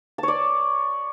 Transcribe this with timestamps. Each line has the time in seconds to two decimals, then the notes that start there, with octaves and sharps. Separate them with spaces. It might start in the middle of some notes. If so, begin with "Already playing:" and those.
0.18 A5
0.23 C#5
0.28 D5